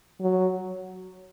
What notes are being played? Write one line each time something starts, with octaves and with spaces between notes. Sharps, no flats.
F#3